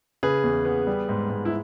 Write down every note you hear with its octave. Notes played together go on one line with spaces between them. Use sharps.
C#3 G#4 B4
E2
B3
G3
G#2
G#2
E4